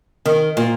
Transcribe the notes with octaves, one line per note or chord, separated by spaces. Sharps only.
D#3
A#2